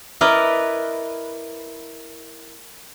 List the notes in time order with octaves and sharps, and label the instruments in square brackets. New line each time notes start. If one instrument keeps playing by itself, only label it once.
[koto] E4 A#4 B4 D5 D#5